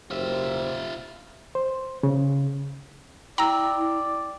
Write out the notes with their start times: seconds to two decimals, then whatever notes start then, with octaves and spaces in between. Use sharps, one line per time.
0.11 F#1 F4 G4 C5 E5
1.55 C5
2.03 C#3
3.38 E4 D5 G5 A#5 E6